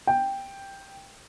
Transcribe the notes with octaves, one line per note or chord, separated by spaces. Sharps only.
G5